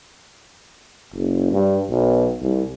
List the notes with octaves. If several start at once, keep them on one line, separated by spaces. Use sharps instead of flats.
F#1
G2
B1
C2